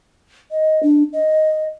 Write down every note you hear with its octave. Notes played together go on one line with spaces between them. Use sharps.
D#5
D4
D#5